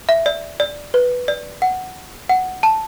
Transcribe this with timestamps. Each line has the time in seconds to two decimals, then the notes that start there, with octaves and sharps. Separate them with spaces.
0.09 E5
0.26 D5
0.60 D5
0.94 B4
1.28 D5
1.62 F#5
2.29 F#5
2.63 A5